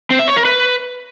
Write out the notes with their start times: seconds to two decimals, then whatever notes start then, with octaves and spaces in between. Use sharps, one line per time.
0.10 C4
0.19 E5
0.28 C#5
0.36 A#4
0.45 B4